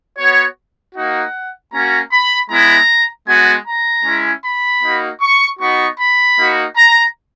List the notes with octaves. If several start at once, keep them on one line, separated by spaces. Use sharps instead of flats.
B3 F#4 C#5
A#3 D#4 F#4 F#5
A#3 C#4 F#4 A#5
B5
G#3 B3 E4 A#5
G#3 B3 F#4 G#5
A#5
G#3 C#4 E4
B5
A#3 D#4 F#4
C#6
B3 D#4 F#4 C#6
B5
A#3 D#4 F#4
A#5